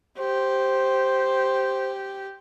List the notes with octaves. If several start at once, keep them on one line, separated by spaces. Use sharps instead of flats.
G4 C5